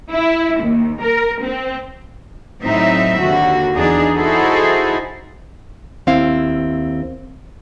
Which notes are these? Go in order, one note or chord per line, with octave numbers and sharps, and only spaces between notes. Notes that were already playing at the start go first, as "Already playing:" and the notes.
E4
D#2
A#4
C4
A2 F#3 C4 D#4 E5
D#2 D3 F#4
E2 D4 D#4 G#4
D#4 E4 F#4 G#4 A4 C5
D#2 C4 E4 F5